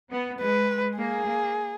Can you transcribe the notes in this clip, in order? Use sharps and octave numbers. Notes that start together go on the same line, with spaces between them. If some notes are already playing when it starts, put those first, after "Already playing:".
B3
G#3 B4
A#3 G#4
A#3